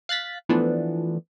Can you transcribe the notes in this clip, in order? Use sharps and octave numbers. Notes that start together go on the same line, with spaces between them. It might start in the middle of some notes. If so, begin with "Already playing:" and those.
F5 F#6 A6 B6
E3 F3 A3 B3 D4